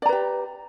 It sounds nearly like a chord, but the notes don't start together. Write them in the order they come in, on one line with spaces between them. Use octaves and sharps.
D5 A#5 B4 G4